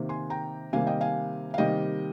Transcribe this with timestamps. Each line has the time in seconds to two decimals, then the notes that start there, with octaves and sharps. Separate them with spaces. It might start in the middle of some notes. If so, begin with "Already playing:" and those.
Already playing: C3 D#3 A#3
0.09 G#5 C6
0.30 G5 A#5
0.73 C3 D#3 G3 A#3 F5 G#5
0.87 D#5 G5
1.01 F5 G#5
1.54 F5
1.58 C3 D#3 G3 A#3 D#5 G5